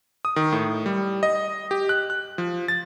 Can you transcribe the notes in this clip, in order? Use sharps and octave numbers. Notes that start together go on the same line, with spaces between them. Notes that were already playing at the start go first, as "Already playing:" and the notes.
D#6
D#3
A2
G3
D#5
G4
F#6
F#6
F3
A6